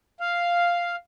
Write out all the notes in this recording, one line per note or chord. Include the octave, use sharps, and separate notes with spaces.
F5